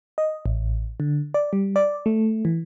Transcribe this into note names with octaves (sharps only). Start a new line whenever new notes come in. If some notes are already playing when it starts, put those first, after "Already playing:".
D#5
A1
D3
D5
G3
D5
A3
E3